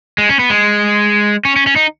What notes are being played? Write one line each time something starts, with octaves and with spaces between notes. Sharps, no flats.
G#3
C#4
B3
G#3
C#4
C#4
C#4
D#4